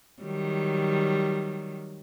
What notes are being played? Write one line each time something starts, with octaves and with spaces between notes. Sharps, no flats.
D#3 F#3 G3